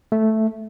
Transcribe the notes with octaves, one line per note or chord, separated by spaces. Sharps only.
A3